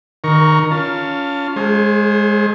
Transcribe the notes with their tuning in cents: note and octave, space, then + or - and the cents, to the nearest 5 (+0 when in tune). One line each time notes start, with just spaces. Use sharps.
D#3 -20 A#4 +10 C#6 +10
C#4 +25 F4 +0 A5 +20
G#3 +0 G#4 +45 C5 +35